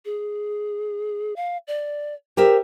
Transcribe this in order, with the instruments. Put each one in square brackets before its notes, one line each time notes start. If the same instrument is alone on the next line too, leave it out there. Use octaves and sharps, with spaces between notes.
[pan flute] G#4
F5
D5
[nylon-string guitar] G4 A#4 E5 [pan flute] C5